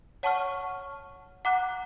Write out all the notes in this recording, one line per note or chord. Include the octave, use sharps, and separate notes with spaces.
C#5 F#5 A5 C#6 F6
F#5 A#5 D6 F#6